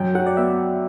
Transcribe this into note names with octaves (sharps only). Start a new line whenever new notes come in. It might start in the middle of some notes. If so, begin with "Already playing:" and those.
Already playing: F#2 G5
F#3 F#5
D5
B3 E5